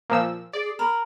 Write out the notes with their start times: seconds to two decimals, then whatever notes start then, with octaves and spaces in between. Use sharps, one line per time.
0.10 A#2 F3 E6
0.53 G#4 D5
0.79 A#4 B5